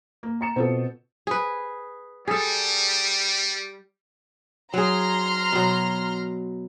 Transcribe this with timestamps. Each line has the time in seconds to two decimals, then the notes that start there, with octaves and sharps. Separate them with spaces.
0.23 A#3
0.41 A#5 C#7 E7
0.56 B2 C4 F4 A4
1.27 G#4 B4
2.28 G3 G#4 A4
4.74 F#3 G#4 A#5 C6 F6
5.52 B2 F#3